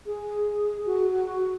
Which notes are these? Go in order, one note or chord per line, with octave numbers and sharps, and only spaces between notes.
G#4
F#4